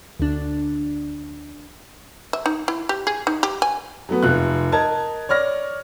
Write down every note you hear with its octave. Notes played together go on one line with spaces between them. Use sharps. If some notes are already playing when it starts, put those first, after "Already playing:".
D2 D4
E5
D#4
E4
G4
G#4
D#4
G4
G#5
F#3 A3 B3
F1 F4 F#6
A#4 D#5 A5 G#6
C#5 D5 F6 A#6